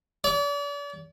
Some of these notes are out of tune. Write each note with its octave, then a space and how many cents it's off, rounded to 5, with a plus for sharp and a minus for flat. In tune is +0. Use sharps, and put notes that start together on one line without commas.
D5 -40